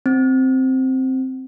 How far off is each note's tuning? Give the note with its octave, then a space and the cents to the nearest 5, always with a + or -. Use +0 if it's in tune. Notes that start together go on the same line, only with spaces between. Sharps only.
C4 +0